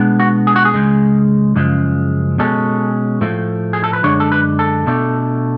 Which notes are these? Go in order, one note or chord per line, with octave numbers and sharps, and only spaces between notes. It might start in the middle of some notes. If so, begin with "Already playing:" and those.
Already playing: B2 G#3 B3 D4
F#4
G#4
F#4
G#4
C#2 C#3 G#3
F#2 C#3 F3 G#3
B2 G#3 C#4 A4
A2 F3 A3
G#4
A4
B4
F#2 D3 G#3 D4 C#5
A4
B4
A4
B2 A3 D4